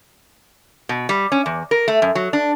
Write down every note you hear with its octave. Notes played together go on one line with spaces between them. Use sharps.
B2
G3
C#4
E2
A#4
A3
F#2
F#3
D4